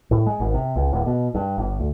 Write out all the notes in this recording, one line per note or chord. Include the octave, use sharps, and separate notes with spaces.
A2
G#3
G#1
C3
C#2
D1
B2
G2
G1
D2